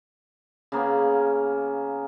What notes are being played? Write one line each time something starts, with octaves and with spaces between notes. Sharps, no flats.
C#3 A#3 B3 C#4